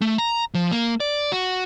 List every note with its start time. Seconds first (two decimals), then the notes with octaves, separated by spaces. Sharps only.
0.01 A3
0.18 A#5
0.54 F3
0.71 A#3
1.00 D5
1.32 F#4